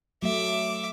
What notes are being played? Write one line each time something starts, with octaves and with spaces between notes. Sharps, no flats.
F#3 A3 E5 D6